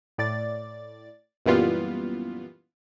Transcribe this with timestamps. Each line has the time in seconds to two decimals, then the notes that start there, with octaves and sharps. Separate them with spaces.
0.18 A2 D5 A6
1.46 F#2 A#2 E3 G3 B3 F4